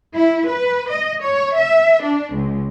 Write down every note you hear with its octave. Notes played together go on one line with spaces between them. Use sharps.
E4
B4
D#5
C#5
E5
D4
C#2